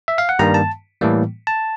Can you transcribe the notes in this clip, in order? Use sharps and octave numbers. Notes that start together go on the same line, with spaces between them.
E5
F5
F#5
G2 D#3 G3 A#3 A#5
A5
A2 E3 G3 A#3
A5